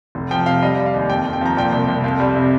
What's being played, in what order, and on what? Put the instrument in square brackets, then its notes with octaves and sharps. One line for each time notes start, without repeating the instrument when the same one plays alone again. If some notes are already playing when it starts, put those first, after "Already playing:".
[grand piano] F1
F3 G5
C3 F5
G3 D#5
G3
F5
D#2
F2 G5
F2
G5
F3 A#5
A#2 G5
C2
C2
F2 F5
G3
C3